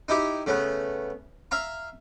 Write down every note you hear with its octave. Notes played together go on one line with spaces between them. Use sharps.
D#4 E4 G4
C#3 A3 B3
E5 F5 A#5